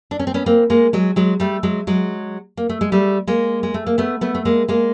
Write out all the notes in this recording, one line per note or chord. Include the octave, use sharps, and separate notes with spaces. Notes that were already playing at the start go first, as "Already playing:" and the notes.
D4
C#4
C4
B3 C#4
A#3 C4
G#3 A#3
F#3 G#3
F#3 G#3
G3 A3
F#3 G#3
F#3 G#3
A#3
A3
G#3
G3 A3
G#3 A#3
G#3
A3
A#3
A3 B3
A3 B3
A3
G#3 A#3
G#3 A#3